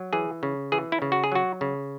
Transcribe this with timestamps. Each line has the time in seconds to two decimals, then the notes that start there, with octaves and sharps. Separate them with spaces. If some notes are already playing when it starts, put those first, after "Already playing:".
Already playing: F#3
0.13 E3 G#4
0.43 C#3
0.72 E3 G#4
0.92 E4
1.02 C#3
1.12 F#4
1.24 G#4
1.32 F#3 F#4
1.61 C#3